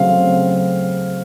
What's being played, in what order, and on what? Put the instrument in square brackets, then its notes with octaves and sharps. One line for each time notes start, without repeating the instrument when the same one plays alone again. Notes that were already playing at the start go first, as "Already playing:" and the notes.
Already playing: [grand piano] C#3 F#3 A3 C4 [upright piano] F5